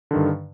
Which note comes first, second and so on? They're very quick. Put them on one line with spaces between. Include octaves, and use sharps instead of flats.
D3 D#3 G2